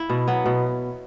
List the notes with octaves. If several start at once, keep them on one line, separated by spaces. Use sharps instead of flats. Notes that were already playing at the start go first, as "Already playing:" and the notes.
Already playing: E4
B2
F#3 B3
B2